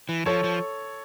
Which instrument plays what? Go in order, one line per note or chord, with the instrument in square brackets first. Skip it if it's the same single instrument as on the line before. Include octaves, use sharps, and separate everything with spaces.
[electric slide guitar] E3
[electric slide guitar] F3 [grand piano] A4 C#5
[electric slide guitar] F3